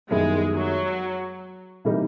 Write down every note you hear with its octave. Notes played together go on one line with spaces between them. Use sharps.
F#2 D#3 G3 G#3 B3 E4
F#3
C3 E3 G3 A#3 D#4